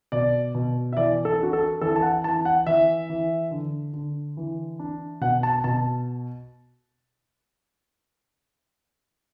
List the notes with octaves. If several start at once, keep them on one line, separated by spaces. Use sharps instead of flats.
B2 D5
B2
E5
E3 D5
A4
D4 F#4
A4
E3 A4
A5
F#5
E3 A5
F#5
E3 E5
E3
D3
D3
E3
D4
B2 F#5
A5
B2 A5